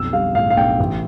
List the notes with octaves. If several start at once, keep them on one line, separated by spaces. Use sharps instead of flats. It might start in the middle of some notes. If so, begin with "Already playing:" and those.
Already playing: B1 F2 E6
G3 F5
A2 F5
F5
B1 G5
A1